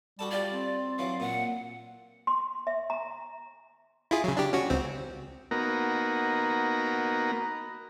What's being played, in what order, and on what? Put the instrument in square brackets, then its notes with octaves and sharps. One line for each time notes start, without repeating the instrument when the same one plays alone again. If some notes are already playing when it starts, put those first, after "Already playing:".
[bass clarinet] G3 [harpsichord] F#4 A4 A5
[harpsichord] F4 G4 [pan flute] D5
[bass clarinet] C4
[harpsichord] E3 F#3 [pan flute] F5
[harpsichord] A#2 [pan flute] F#5
[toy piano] C6
E5
A#5
[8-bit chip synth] E4 F4 G#4
C#3 F#3
D4 G4
C#4 F#4
C#2 C4
[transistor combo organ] A#3 B3 D#4 F#4 A#4